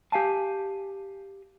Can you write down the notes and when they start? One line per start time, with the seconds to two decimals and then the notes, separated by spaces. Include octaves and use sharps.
0.12 G4 F5 G#5 A5